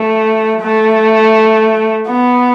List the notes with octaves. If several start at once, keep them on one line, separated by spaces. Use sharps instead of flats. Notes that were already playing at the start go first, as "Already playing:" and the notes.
Already playing: A3
A3
B3